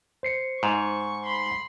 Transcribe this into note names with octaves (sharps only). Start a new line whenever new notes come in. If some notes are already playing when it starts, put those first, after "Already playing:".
C5 C7 C#7
G#2 C#6
B5 C6